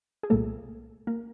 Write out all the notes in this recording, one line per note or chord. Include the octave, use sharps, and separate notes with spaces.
G#4
C2 A#2 G3 A3 A#3 A4
A#3 A#4